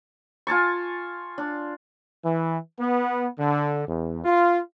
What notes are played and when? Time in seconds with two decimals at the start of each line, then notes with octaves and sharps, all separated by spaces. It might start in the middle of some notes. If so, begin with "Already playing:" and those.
0.47 F4 G#5 A5 C#6
1.38 D4
2.24 E3
2.80 B3
3.38 D3
3.87 E2
4.24 F4